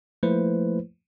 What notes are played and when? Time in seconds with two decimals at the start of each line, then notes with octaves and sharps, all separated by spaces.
0.23 F3 A3 A#3 E4 B4 C5